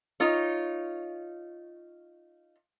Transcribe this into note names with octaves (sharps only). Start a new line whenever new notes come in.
D#4 F4 C#5